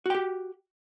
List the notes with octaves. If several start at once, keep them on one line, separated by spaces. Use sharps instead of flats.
F#4 G4 G5